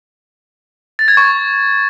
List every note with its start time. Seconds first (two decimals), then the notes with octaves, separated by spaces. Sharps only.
0.99 A6
1.08 G#6
1.17 C#6